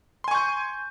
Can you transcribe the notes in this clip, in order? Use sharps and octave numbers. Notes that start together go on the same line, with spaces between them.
G#5 C6 C#6 G6